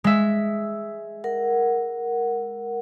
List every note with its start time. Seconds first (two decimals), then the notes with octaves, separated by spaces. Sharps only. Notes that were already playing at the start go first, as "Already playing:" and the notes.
0.04 G#3 E5
1.24 A#4 F#5